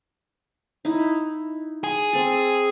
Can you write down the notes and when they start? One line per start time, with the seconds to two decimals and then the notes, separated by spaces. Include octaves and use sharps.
0.85 D#4 E4
1.84 G#4
2.13 C4 A4